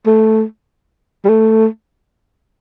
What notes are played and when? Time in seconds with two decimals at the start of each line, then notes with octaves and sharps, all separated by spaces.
0.06 A3
1.25 G3
1.29 A3